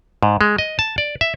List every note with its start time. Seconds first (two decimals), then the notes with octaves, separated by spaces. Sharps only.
0.23 G#2
0.41 G#3
0.58 D#5
0.79 A5
0.98 D5
1.21 E5